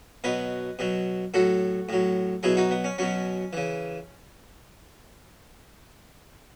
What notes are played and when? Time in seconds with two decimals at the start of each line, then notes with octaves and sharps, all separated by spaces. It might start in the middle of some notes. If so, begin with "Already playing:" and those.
0.24 B2 F#3 B4 D#5
0.79 B2 F#3
1.34 A2 F#3 F#4 A4
1.89 A2 F#3
2.43 B2 F#3 E4 G#4
2.57 D#4 F#4
2.71 B3
2.84 C#4
2.98 B2 F#3 C#4
3.53 C#3 E3